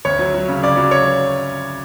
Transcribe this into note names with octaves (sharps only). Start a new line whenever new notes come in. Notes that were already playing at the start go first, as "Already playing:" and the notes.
D2 C#5
F#3
F#3
C#3
C#3 D5
F#3
C#5